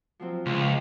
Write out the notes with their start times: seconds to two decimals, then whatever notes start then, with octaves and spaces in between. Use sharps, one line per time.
0.20 F3 F#3 C4
0.46 C#2